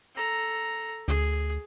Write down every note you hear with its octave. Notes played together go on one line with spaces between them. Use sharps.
A4 A#5
D2 G#4